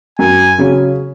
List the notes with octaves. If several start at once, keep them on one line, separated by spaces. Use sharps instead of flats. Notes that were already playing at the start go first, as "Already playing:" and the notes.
F#2 G#5
C#3 F#3 C#4